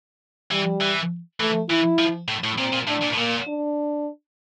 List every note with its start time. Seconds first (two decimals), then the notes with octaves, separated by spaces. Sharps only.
0.51 E3 G3
0.81 E3
1.40 E3 A3
1.70 E3 E4
1.99 F3
2.28 A2
2.44 A2
2.58 A#2 C4
2.73 A#2
2.88 A2 D4
3.02 A#2
3.14 A2
3.17 A#2 A#3
3.47 D4